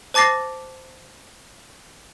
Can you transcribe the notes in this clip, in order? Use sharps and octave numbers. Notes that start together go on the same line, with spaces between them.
C5 A5 D6 A6 A#6 C7